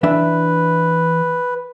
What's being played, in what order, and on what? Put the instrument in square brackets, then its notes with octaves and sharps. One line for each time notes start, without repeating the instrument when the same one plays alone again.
[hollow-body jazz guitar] E3 D4 E5 [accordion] B4